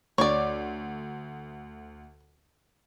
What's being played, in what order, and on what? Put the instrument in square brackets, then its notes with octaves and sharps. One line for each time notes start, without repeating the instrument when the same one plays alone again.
[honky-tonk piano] D2 [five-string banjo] C#5 D5